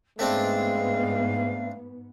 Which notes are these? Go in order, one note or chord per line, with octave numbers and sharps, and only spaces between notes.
G#2 G#3 A3 B3 C4 D4 F5